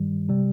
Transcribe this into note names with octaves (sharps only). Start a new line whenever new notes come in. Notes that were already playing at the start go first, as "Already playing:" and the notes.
Already playing: G2 D#3 G3
C3 G3